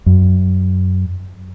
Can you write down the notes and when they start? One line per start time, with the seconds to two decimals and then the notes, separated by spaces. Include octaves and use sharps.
0.06 F#2